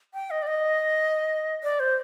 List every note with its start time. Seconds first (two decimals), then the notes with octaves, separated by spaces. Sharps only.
0.14 G5
0.30 D#5
0.42 D5
0.47 D#5
1.63 D5
1.80 C5